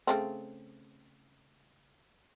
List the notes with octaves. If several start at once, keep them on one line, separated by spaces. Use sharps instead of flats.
C#3 A3 C4